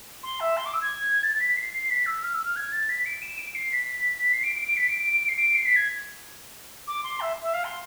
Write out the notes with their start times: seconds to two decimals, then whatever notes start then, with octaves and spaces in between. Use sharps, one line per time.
0.23 C6
0.40 E5
0.57 C6
0.66 D6
0.74 E6
0.82 G#6
1.23 A6
1.33 A6
1.40 B6
1.57 C7
1.73 C7
1.90 B6
2.06 E6
2.23 F6
2.33 E6
2.45 F6
2.56 G#6
2.72 A6
2.89 B6
3.06 D7
3.22 E7
3.38 D7
3.55 C7
3.72 B6
4.22 B6
4.33 C7
4.43 D7
4.55 D7
4.66 D7
4.77 B6
4.88 D7
4.99 D7
5.10 D7
5.21 D7
5.28 C7
5.36 D7
5.55 C7
5.65 B6
5.76 G#6
6.87 D6
7.03 C6
7.21 E5
7.42 E5
7.53 F5
7.64 C6